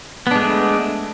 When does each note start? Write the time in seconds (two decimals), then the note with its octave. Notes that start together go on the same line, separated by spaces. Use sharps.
0.27 B3
0.31 D4
0.36 G#3
0.40 A3